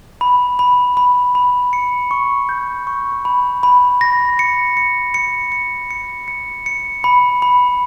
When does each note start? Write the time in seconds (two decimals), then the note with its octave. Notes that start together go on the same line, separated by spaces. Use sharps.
0.21 B5
0.59 B5
0.97 B5
1.35 B5
1.73 C#7
2.11 C#6
2.49 G6
2.87 C#6
3.25 B5
3.63 B5
4.01 A#6
4.39 C#7
4.77 C#7
5.14 C#7
5.52 C#7
5.91 C#7
6.28 C#7
6.66 C#7
7.04 B5
7.42 B5